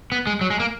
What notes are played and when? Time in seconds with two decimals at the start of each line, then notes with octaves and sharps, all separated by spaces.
0.12 B3
0.27 G#3
0.41 F#3
0.50 G#3
0.60 A#3